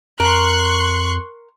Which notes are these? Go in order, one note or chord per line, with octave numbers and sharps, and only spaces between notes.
F2 A#4 C6 C#6 F#6